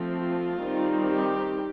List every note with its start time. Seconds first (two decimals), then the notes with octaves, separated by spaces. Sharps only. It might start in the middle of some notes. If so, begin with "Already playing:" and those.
Already playing: F3 A3 C4
0.16 F4
0.64 D#3 G3 C4 D#4
1.11 G4